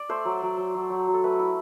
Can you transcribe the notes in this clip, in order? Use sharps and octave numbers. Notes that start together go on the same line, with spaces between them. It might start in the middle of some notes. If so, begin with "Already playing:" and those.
Already playing: D5
A3 C5
F#3
F#3
F#3
F#3
F#3
F#3
A4
A3 B4
E4